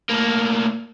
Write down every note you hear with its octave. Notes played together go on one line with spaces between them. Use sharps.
A2 A#3